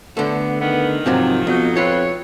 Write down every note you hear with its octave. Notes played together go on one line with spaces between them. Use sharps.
D3 A3 B3
D#3 B3
G#2 C3 F3 F#3 C4
F2 B2 F#3 D#4
C4 F4 B4 C#5